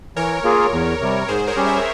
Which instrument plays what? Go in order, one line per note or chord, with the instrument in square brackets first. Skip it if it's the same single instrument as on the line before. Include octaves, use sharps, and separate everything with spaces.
[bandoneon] E3 [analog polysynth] A#4 C#5
[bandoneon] A#3 F4 G#4
E2
C3 G3
[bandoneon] G#2 [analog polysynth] G#4 C5
[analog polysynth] A#4 C#5
[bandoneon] G3 C#4 G4
[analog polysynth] C5 E5